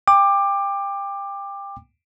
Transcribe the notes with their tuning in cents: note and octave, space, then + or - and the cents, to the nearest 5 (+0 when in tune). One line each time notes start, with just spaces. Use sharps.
G5 +25 D6 +15